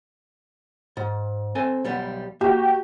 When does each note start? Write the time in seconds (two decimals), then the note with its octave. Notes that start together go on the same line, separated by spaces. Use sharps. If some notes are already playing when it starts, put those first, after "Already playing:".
0.97 G#2
1.55 C4 A4 G#5
1.84 B1 G3 B3
2.41 A#3 F#4 G4